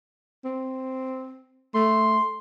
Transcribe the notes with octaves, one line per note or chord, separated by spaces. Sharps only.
C4
A3 C6